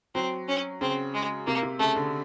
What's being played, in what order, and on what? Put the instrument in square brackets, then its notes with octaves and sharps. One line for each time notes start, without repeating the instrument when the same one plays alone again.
[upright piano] F#3 [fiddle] C4
[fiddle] C#4
[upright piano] C#3 [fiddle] C4
[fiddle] G#3
[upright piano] C3 [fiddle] A#3
[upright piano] C3
[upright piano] C#3 [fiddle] A3
[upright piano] D3